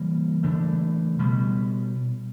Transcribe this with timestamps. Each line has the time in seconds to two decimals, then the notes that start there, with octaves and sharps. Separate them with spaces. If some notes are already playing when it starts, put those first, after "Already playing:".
Already playing: C#3 E3 G3 A#3
0.43 C#3 E3 A3 D4
1.19 B2 G3 B3